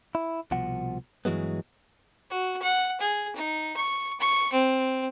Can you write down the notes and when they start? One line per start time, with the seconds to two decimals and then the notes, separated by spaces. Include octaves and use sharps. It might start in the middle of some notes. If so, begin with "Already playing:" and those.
0.15 E4
0.51 C2 B2 F3 F#5
1.25 G2 E3 F#3 G#3 B3
2.30 F#4
2.62 F#5
3.00 G#4
3.36 D#4
3.77 C#6
4.20 C#6
4.52 C4